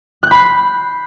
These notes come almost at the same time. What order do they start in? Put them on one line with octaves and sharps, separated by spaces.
F#6 G6 B5 C7